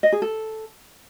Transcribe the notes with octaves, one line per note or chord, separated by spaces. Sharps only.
D#5
G#4
A4